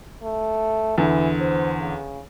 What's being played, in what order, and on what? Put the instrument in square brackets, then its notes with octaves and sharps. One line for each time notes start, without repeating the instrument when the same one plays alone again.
[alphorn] A3
[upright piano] E2 D3 [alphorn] E3
[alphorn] C5
C#3